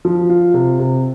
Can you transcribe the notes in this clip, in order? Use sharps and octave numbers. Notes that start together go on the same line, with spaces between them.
F3
F4
C3
C3